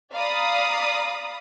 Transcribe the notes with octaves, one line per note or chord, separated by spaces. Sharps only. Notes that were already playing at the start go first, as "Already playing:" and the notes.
D5 F5 A#5 B5 D#6